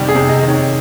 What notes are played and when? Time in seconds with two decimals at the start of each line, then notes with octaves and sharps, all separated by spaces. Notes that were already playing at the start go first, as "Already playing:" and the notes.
Already playing: C3 D#3 G3 G5
0.09 G#4
0.15 C3
0.29 D#5
0.43 D#3
0.49 C#5